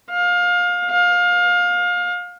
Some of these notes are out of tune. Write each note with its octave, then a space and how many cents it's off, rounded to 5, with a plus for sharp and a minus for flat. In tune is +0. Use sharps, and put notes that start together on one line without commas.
F5 +25
F5 +25